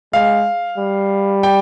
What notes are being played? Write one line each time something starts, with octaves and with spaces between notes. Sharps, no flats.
G#3 F5
G3
G5